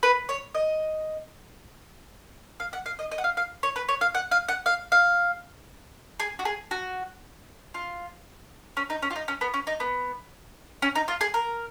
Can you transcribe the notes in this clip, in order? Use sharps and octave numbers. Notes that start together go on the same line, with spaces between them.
B4
C#5
D#5
F5
F#5
F5
D#5
D#5
F#5
F5
F5
C#5
B4
C#5
F5
F#5
F5
F#5
F5
F5
G#4
F#4
G#4
F#4
F4
C#4
D#4
C#4
F4
D#4
C#4
B3
C#4
D#4
B3
C#4
D#4
F4
G#4
A#4